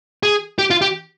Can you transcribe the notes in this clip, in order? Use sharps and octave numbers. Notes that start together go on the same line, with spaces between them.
G#4
G4
F4
G4